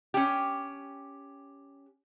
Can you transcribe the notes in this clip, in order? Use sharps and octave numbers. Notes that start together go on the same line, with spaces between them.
C#4 G4